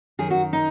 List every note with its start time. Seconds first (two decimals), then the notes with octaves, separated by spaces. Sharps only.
0.19 F#2 D#3 G#4
0.30 F#4
0.53 D#4